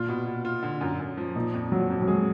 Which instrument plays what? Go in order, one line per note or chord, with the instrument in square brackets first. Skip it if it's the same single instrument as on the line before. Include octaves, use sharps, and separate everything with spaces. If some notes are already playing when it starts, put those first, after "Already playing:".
Already playing: [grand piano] A#2 [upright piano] F4
[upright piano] B2
B2
F4
D3
F#2
F#2
F3
[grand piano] A#2 [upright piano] D#4
[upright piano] F2
[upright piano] F3 [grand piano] F#3
[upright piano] F2
[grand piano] F#3
[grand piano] G#3 [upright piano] G#4